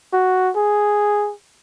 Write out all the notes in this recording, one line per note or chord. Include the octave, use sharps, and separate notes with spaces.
F#4
G#4